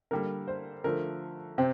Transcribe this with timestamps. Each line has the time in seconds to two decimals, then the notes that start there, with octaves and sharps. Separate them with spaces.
0.11 D3 G3 A#3 A#4
0.48 C5
0.84 D3 F3 A3 A#4
1.58 C3 C4